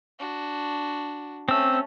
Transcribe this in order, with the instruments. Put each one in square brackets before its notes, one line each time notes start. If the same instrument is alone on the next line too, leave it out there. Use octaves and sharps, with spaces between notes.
[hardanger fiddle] D4 F#4
[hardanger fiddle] A3 C#4 [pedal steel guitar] C4 E6